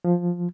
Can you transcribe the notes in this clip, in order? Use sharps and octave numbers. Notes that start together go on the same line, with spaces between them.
F3